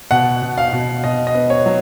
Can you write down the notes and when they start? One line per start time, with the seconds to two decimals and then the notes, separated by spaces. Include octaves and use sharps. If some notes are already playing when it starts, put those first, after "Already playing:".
0.11 B2 F#5
0.42 B2
0.58 F5
0.73 B2
1.04 B2 D#5
1.27 D#5
1.34 B3
1.50 C#5
1.66 F#3